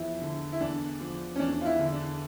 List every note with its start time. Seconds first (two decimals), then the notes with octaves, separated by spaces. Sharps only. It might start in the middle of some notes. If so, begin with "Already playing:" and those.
Already playing: E2 F3 E4
0.22 D3
0.52 E4
0.61 E2 D4
1.01 F3
1.36 C#4
1.39 E2 D4
1.61 F4
1.65 E4
1.79 D3
1.92 D4